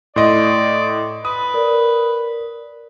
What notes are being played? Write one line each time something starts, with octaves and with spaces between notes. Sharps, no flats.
A2 D5 D#5 C6
B4 D#6
A#4 D5